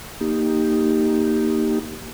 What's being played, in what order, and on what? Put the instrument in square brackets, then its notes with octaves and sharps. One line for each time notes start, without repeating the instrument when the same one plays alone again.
[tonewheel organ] A#3 D#4 G4